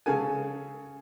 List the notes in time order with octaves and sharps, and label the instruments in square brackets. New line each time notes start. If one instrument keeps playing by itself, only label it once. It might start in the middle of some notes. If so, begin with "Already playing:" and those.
[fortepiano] C#3 G#4 A4 G#5